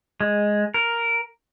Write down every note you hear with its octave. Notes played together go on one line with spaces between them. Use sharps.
G#3
A#4